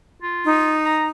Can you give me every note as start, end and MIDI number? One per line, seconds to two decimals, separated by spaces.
0.22 0.74 65
0.45 1.09 63
0.85 1.06 82